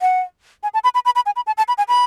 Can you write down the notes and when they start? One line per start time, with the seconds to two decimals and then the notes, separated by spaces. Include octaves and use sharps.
0.01 F#5
0.63 G#5
0.74 A5
0.84 B5
0.94 B5
1.05 B5
1.16 B5
1.26 G#5
1.36 B5
1.47 A5
1.58 A5
1.68 B5
1.78 G#5
1.88 B5